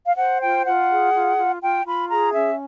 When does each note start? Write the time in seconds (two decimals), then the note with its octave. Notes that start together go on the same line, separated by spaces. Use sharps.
0.07 F5
0.17 C5 F#5
0.41 F4 G5
0.66 F4 F#5
0.90 G#4
1.13 F4
1.38 F4
1.62 F4 G5
1.86 F4 B5
2.11 G#4 A#5
2.34 C#4 E5